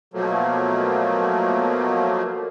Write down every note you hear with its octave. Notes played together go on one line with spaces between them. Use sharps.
B2 F3 F#3 A3 A#3